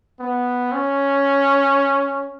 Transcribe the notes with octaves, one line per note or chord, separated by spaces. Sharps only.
B3
C#4